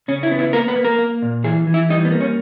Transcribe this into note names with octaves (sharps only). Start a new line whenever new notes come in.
C#3 C#4
E4
B3
E4
A#3 A#4
B4
A#3
A#4
A#3
A#2
E3 G#4
E3
E4
G3 D#4
B3
A#3
C#4